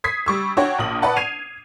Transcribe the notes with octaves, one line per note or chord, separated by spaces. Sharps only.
D#6 G#6 B6 C7
G3 C#6 E6
D4 F#4 C#5 G5
A#1 A#2 D#6 F#7
B4 D5 F#5 A5
G#6 C7 D#7 F7